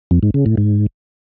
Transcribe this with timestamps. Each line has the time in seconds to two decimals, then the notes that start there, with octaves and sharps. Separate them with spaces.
0.11 F2
0.23 G#2
0.34 C#3
0.46 A2
0.57 G#2